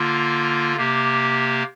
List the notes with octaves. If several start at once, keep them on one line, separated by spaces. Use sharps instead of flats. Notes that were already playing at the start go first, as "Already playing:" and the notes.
Already playing: D3 A#3 F4
C3 A#3 G4